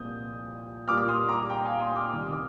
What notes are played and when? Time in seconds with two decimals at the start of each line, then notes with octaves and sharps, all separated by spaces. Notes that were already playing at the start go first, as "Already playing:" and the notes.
Already playing: C2 A#2 F3 A#3 D#6 G6
0.87 A#2 G3 A#3 D6 F6
0.98 F6
1.08 C6 D#6
1.29 A#5 D6
1.50 G5 A#5
1.65 F5 G#5
1.80 C6 D#6
1.96 D6 F6
2.11 C2 C3 D#3 G3 F6
2.22 D#6
2.32 D6 F6